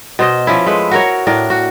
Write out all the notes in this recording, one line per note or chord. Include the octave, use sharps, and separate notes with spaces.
B2 C5 D#5
F3 C#4 E4
G#3 A3 B4 C5
F#4 A#4 C#5
A2 D4 A#4
F#4